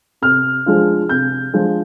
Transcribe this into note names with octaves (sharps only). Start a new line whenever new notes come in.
C3 F6
F3 G#3 D4 F4
C3 G6
F3 G#3 D4 F4